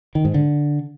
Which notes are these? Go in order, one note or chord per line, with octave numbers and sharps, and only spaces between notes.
D#3
G#2
D3